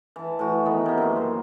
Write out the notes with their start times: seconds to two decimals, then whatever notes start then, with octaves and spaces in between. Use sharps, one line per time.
0.16 E3 A5
0.39 A2 E3 F#4
0.65 D#3 B3
0.86 C3 A#3
0.98 F#2 C6
1.16 C5